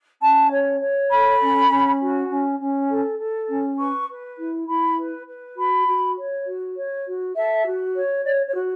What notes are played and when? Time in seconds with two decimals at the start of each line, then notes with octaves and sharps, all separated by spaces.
0.21 C#4 A5
0.51 C#5
0.81 C#5
1.10 A4 B5
1.41 C#4
1.69 C#4
2.00 F#4
2.29 C#4
2.59 C#4
2.88 A4
3.18 A4
3.49 C#4
3.78 B4 C#6
4.08 B4
4.38 E4
4.67 E4 B5
4.97 B4
5.26 B4
5.56 F#4 B5
5.87 F#4
6.16 C#5
6.46 F#4
6.76 C#5
7.06 F#4
7.35 A4 E5
7.65 F#4
7.94 C#5
8.24 C#5 D5
8.47 C#5
8.54 F#4